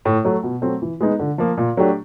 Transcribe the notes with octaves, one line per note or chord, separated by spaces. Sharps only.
A2
F#3 A3
B2
F#3 A3 C4
E3
G#3 B3 D#4
D3
F3 A#3
A#2
F#3 A3 D4 G4